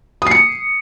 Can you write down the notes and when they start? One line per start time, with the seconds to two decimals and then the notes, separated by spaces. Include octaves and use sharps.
0.22 D#6
0.27 C7
0.31 C#7